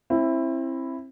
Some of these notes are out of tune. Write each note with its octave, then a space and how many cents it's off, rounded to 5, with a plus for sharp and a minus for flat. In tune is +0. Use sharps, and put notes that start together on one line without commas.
C4 +30 E4 +5